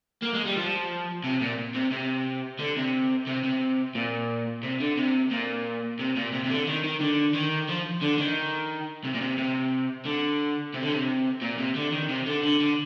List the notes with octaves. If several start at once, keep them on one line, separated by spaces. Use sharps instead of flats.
A#3
G#3
G3
F3
C3
A#2
C3
C3
D3
C3
C3
C3
A#2
C3
D3
C3
A#2
C3
A#2
C3
C3
D3
D#3
D#3
D3
D#3
F3
D3
D#3
C3
A#2
C3
C3
D3
C3
D3
C3
A#2
C3
D3
D#3
C3
D3
D3
D3